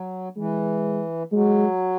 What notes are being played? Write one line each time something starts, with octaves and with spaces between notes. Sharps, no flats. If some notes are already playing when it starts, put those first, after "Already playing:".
Already playing: F#3
E3 G#3
F#3 G#3